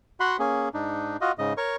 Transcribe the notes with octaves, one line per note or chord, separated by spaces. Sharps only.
F#4 F#5 B5 C6
A#3 C#4 G#4
G#2 D4 D#4
F4 F#4 D#5
G#2 C#3 D#5
A#4 C#5 C#6